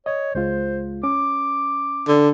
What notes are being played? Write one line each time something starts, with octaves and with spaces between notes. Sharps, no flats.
C#5 D#5
C#2 G#3 F4 C5
C#4 D6
D3